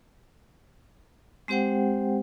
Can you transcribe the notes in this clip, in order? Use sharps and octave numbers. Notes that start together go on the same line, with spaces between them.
G#3 C4 G4 C5 F#5 G5